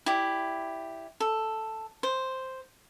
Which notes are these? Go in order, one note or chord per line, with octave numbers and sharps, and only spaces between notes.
E4 G4 D5
A4
C5